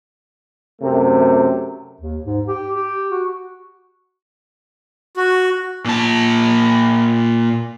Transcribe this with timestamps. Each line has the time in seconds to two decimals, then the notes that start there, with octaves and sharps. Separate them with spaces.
0.82 F#2 C3 A3 A#4
2.00 D#2
2.25 G#2
2.48 G4
2.74 G4
3.11 F#4
5.17 F#4
5.85 A#2 A5